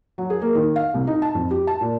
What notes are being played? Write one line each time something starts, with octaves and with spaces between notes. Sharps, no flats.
F#3
G#4
A#3
D#3
F5
C2
D#4
A5
F2
G4
A5
A#2